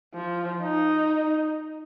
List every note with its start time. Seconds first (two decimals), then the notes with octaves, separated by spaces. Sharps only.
0.14 F3
0.62 D#4